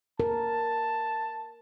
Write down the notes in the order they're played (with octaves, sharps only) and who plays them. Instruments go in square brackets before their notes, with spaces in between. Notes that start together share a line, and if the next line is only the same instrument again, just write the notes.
[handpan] A#4 [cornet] A5